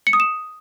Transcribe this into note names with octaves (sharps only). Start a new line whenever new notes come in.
C#7
D#6
E7